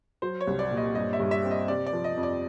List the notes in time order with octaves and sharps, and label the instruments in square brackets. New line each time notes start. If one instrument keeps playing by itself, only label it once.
[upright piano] F#3 [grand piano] C5
[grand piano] C#5
[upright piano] C2
[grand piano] D5
[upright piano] A#2
[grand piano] D#5
[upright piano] G2 [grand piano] D#5
[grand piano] E5
[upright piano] G2
[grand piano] E5
[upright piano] C4
[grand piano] D#5
[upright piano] C3 [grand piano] D5
[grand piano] D5
[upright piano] F3
[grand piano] D#5
[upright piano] F2
[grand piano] D5